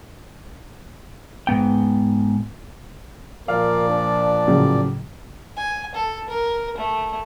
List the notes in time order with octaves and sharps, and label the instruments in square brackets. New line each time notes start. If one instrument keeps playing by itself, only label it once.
[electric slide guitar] G#2 B3 G5
[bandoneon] A#2 F3 D5 [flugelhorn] A#4 [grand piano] F5 F6
[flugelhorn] D4
[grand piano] A2 C#3 F#3
[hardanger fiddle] G#5
A4
A#4
A3